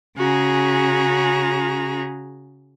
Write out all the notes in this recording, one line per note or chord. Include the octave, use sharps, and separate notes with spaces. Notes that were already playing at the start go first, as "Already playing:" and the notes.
C#3 C#4 F#4 G#4 A#5